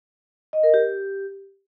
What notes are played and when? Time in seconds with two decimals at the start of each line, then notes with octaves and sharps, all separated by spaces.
0.53 D#5
0.63 A#4
0.74 G4